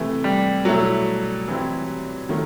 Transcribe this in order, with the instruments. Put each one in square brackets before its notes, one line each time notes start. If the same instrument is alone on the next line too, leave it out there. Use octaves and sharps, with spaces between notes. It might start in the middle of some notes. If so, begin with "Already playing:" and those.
Already playing: [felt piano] C3 E3 A3
[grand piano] G3
[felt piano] B2 A3 E4 A4 [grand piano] F#3
[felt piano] E3 G3 C4 E4
D#3 F#3 A3